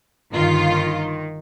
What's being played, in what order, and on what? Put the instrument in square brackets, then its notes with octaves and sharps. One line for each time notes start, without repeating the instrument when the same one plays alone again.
[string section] G1 F4 [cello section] D#3